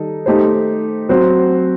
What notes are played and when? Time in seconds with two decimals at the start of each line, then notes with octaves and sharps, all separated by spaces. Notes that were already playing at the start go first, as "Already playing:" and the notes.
Already playing: D#3 G3 D#4 A4
0.26 A3 D#4 G4 C5
1.09 F#3 C4 F#4 C5